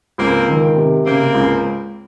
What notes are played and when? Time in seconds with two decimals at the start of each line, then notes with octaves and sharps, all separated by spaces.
0.18 C#2 A#3 C4
0.48 D#3
0.76 C3
1.06 C#3 A#3 C4
1.34 C#2